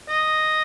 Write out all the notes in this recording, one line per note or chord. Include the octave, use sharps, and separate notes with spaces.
D#5